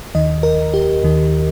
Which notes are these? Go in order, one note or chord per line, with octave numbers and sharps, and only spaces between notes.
D#2 D#3 D#5
A#4
G4
D#2 D#3